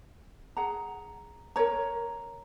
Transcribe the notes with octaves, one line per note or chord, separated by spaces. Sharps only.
G#4 F#5 A#5
A#4 C#5 A#5